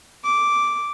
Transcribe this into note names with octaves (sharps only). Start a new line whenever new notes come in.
D6